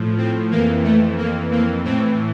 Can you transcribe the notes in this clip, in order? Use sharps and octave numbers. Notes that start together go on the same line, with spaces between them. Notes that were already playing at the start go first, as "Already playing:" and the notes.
Already playing: A2 F3
C4
F2 E3 A#3
A3
A#3
A#3
A2 E3 C4